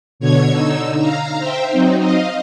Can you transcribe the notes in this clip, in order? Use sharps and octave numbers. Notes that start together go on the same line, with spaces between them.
B2 D3 C#5 G#6
D3 D#4 E6
F5 A#5
C5 E5 G5
F#3 C4 D#4
D#5 F5